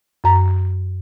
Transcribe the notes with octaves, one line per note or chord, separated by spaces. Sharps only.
F#2 A#5